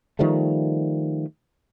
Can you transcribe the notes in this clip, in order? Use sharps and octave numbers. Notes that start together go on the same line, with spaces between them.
D#3 F3 G3 A3